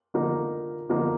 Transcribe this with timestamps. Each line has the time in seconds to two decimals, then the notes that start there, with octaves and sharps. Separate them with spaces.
0.14 D3 F3 A#3 D#4
0.89 D3 F3 A#3 D#4